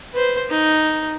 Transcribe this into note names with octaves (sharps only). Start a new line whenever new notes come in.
B4 C5
D#4